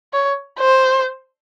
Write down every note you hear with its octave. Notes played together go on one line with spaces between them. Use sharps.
C#5
C5